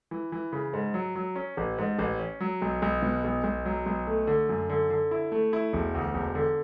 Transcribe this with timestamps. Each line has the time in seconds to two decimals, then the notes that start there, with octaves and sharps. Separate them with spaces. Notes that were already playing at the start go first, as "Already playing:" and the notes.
0.11 E3
0.32 E3
0.53 C#3
0.73 G#2
0.94 F#3
1.16 F#3
1.36 C#4
1.57 A1
1.78 G#2
1.99 A1
2.19 C#4
2.40 F#3
2.62 B1
2.82 B1
3.03 B2
3.24 B1
3.44 B1
3.65 F#3
3.86 B1
4.07 A3
4.27 D3
4.49 F#2
4.69 D3
4.90 D3
5.11 E4
5.32 A3
5.53 E4
5.73 E1
5.95 D2
6.14 E1
6.35 D3